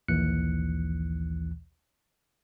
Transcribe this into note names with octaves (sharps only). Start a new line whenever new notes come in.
A#1 D#2 E3 F#6 C#7